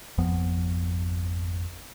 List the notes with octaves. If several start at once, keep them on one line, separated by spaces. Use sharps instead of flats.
G#1 F2 F3 B3